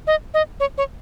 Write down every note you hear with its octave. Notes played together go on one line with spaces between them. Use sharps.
D#5
D#5
C#5
C#5